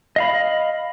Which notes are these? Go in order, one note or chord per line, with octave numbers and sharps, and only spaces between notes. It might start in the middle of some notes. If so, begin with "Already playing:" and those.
D#5 F5 B5